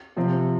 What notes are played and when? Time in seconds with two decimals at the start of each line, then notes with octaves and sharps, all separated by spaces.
0.16 C3 F3 C4